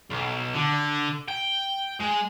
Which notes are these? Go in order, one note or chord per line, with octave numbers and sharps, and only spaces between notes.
B1
D3
G5
G#3